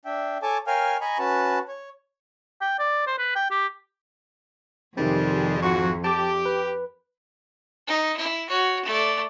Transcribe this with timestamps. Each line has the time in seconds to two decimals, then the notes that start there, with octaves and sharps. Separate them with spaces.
0.05 D4 E5 G5
0.43 A4 C#5 G#5 A5 D6
0.67 A#4 C#5 F5 G5 G#5 F6
1.01 D#5 G#5 A#5 B5 C#6
1.19 C#4 F#4 B4 A5
1.68 C#5
2.61 G5
2.79 D5
3.07 C5
3.18 B4
3.35 G5
3.50 G4
4.97 F2 C3 D#3 G3 G#3 C4
5.63 G#1 G#2 F4 F#4 C#6
6.04 G4 A5 D6
6.46 B4
7.87 D#4
8.17 E4
8.49 F#4 C#5
8.85 A3 D5